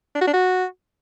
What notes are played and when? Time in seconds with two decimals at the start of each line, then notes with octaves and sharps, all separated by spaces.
0.15 D4
0.21 F#4
0.27 D4
0.33 F#4